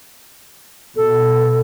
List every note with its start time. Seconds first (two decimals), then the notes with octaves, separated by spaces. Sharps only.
0.96 B2 A4